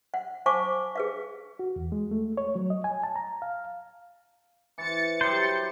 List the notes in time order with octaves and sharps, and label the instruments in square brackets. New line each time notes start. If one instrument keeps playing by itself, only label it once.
[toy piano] F#5
C5 F5 G#5 A5 C#6 D6
G#4 B4 F5
[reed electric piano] F#4
E2
G#3
A3
C#5
F#3
D#5
G#5
A5
A#5
F5
[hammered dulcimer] E3 C5 [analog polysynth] A6 C#7
[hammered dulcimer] F#3 G3 [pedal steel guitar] C5